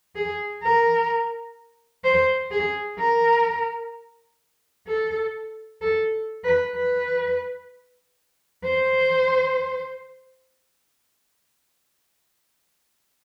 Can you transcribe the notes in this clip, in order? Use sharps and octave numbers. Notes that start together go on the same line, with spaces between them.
G#4
A#4
C5
G#4
A#4
A4
A4
B4
B4
C5